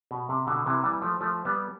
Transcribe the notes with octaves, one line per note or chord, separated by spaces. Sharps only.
B2
C3
B2 D3
C3 E3
E3 G3
F3 A3
F3 A3
G3 B3